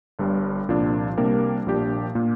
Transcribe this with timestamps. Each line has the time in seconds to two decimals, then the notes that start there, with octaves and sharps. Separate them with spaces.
0.19 G1 G2 G3
0.68 C2 A#2 F3 D4
1.18 C3 G3 A#3 D4 A#4
1.66 A#1 A#2 A#3 D4 G4
2.15 A#2 A#3